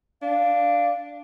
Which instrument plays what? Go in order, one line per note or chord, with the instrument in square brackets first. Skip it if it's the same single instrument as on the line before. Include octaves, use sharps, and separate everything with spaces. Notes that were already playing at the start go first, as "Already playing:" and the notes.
[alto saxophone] D4 [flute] F5